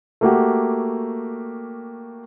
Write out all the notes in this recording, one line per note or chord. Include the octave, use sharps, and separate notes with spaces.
A3 A#3 F#4 G4